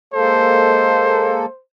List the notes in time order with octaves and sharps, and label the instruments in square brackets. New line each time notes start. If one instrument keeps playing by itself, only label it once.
[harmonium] G#3 A#3 A4 [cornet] C5